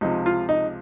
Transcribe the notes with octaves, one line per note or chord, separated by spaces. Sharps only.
C#2 C3 F3 D#4
F4
D#4